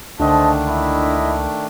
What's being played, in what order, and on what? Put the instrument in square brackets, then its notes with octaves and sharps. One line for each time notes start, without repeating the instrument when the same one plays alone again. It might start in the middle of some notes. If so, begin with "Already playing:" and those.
[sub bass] C#2 [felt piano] D3 [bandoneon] D#3 A3 D4 [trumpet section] C5 D#5 A5
[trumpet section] E4 D#5 B5